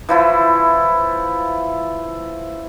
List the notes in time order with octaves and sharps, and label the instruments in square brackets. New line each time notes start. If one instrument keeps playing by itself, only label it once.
[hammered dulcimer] E3 F3 E4